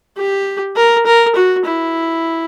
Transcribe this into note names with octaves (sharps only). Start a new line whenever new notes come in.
G4
A#4
A#4
F#4
E4